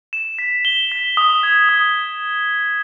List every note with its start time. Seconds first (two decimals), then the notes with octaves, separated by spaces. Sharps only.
0.13 E7
0.39 B6
0.65 G7
0.92 B6
1.17 D#6
1.43 G#6
1.69 D#6